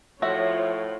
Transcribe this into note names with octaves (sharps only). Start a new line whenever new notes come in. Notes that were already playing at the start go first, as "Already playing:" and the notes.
A2 F3 F4 F#4 C#5 E5